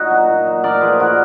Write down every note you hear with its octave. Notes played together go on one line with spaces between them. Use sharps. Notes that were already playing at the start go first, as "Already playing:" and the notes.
Already playing: A#2 D#4 F#4
F#3
A#2
F#3
A#2 A#4 D5
F3 G#4 B4
A#2 F#4 A#4